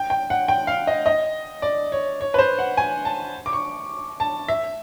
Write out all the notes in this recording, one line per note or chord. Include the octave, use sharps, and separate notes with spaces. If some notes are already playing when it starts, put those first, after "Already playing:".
Already playing: G5
G5
F#5
G5
F5
D#5
D#5
D5
C#5
C#5
B4
C5
F#5
G#5
A5
D6
C#6
A5
E5